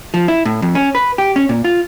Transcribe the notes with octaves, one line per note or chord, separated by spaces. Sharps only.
F3
E4
A2
F2
C#4
B4
G4
C#4
A#2
F4